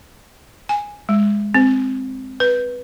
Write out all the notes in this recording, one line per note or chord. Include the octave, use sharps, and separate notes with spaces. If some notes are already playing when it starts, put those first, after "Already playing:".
G#5
G#3
C4
B4